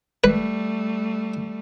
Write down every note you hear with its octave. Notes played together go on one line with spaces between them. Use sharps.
G3 A3 B4